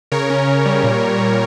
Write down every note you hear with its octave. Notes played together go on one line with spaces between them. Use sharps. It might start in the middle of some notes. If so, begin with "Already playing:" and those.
C#3 A#4 C#5
C#4
C#3
G3
A#2
A#2
A#2